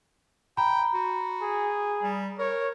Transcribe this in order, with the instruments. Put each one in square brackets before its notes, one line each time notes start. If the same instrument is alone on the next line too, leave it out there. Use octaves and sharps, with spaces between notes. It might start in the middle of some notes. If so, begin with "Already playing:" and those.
[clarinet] G5 [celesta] A#5 B5
[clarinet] F#4
[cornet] G#4
[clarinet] G3
[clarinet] A#4 [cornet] C#5